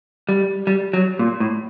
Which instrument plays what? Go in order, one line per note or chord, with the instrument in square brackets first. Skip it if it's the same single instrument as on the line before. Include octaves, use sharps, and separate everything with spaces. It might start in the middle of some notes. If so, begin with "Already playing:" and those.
[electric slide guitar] G3
G3
F#3
A#2
A2